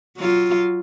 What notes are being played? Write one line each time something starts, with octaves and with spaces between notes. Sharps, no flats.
F#3 F4